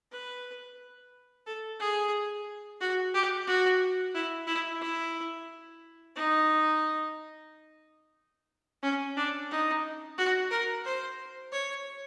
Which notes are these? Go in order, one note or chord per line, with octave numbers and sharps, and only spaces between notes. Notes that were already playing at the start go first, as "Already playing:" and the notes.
B4
A4
G#4
F#4
G4
F#4
E4
E4
E4
D#4
C#4
D4
D#4
F#4
A#4
C5
C#5